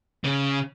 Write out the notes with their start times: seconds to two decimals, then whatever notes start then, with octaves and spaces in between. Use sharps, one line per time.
0.24 C#3